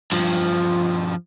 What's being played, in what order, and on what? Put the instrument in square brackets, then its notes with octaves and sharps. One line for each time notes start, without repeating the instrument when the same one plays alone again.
[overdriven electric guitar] G2 F3